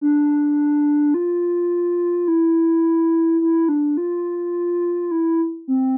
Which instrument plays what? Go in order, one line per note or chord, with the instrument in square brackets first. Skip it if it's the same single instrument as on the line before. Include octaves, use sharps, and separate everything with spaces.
[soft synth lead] D4
F4
E4
E4
D4
F4
E4
C4